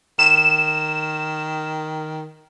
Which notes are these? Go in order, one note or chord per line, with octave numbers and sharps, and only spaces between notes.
D#3 E7